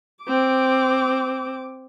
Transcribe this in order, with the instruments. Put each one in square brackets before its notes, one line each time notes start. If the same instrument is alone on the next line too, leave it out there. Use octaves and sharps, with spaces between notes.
[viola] C4 D6